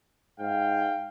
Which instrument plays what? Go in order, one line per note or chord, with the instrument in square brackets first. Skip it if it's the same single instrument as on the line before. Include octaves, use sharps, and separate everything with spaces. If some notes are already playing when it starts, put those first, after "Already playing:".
[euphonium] G#2 [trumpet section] F5 G5